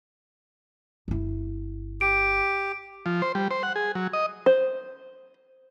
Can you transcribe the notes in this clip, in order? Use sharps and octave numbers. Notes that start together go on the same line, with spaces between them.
G1 E4
G4 D7
F3
C5
G3
C5
F#5
G#4
F#3
D#5
C5